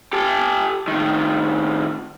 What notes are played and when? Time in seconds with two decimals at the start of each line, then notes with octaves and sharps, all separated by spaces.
0.13 G4 A4
0.88 A2 D#3